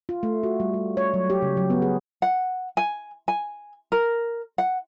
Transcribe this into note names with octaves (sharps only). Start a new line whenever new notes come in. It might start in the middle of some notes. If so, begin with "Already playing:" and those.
F4
A3
F#4
G3
G3
C#5
F#3
G4
C#3
F#3
B3
G#4
F#5
G#5
G#5
A#4
F#5